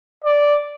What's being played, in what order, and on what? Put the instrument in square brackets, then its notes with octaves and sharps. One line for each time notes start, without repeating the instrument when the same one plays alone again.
[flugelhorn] D5